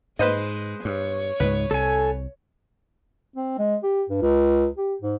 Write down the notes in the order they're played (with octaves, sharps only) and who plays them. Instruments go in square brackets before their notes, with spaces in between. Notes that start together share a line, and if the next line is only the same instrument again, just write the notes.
[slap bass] G#2 [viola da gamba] G#3 [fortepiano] B4 C5 D#5
[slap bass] G2 [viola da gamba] C#5
[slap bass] C#2 G#2 G#3 [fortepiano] B4
[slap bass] C2 [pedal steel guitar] A4 G#5
[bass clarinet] C4
G#3
G4
G2
C#2
G4
G#2